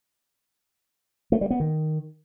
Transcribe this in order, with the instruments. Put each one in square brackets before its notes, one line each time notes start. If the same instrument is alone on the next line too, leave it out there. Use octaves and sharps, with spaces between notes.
[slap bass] A3
G3
B3
D#3